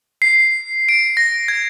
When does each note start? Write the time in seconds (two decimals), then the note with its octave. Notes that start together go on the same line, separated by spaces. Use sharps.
0.22 C7
0.89 D7
1.17 A#6
1.48 G#6